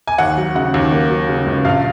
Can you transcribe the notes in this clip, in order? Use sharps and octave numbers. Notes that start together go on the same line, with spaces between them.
G#5
D#2 F#5
F#3
C#3 F#5
D#2
A#3
F#3
C#3
C#2
A#1 F5